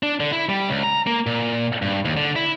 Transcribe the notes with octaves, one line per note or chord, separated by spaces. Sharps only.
D4
D3
E4
G3
C#2
A#5
A#3
A#2
G2
D#2
D3
E4